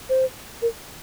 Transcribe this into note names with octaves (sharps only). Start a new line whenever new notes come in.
C5
A#4